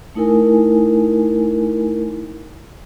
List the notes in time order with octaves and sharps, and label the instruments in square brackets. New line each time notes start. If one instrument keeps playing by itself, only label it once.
[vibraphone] A3 D#4 E4 A#4 G#5